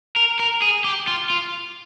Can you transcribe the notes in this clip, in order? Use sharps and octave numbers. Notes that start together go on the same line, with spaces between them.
A#4
A#4
G#4
G4
F4
F4